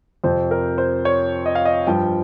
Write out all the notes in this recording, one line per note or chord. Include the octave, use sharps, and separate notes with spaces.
F2 C3 F3 C5
A#4
C5
C#5
D#5
F5
D#5
G2 F3 G5